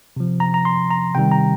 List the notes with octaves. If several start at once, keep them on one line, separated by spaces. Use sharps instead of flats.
C3 F3
A#5
A#5
C6
A#5
C3 D#3 G3 G5
A#5